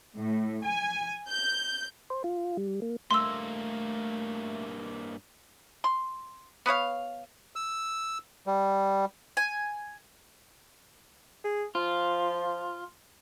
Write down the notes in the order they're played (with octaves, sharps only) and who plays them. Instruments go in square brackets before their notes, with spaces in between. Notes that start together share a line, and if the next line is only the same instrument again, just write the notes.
[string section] A2
G#5
G6
[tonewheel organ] C5
F4
G3
A#3
[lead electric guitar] G2 A#3 [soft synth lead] A3 [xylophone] C6 E6
[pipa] C6
B3 B4 C#5 F5
[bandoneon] E6
G3
[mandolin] G#5
[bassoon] G#4
[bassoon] F3 [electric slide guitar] F4